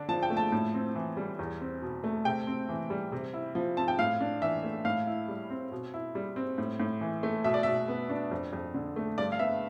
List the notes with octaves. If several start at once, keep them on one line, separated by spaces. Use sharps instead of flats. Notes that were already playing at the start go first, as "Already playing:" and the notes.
Already playing: D3 D4
F3 A5
G5
A3
A5
A2
C4
E3
G3
E2
C4
B2
A3
C3 G5
C4
E3
G3
C3
E4
F3
C4 A5
G5
A2 F5
D4
E3 E5
A3
A2 F5
E4
G3
C4
B2
E4
G3
C4
A2
A2
E3
A3
B2 E5
D5
B2 E5
B3
D4
F2
F2
D3
A3
G2 D5
F5
B3 E5